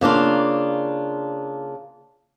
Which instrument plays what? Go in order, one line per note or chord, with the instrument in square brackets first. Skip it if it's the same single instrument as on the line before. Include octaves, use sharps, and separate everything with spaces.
[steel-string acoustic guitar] C#3 A#3 D4 F4